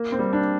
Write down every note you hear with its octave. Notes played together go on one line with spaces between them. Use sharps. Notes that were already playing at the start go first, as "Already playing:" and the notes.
Already playing: A#3
C4
G3
D4